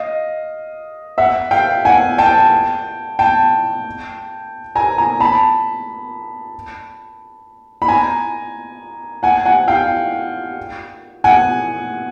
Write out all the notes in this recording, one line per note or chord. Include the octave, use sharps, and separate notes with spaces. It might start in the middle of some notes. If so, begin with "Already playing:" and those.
Already playing: D#5 F5
E5 F#5
F5 G5
F#5 G#5
G5 A5
G5 A5
G#5 A#5
G#5 A#5
A5 B5
B5
G#5 A#5
F#5 G#5
F#5 G#5
F5 G5
F#5 G#5